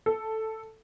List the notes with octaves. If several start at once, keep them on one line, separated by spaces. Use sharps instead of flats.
A4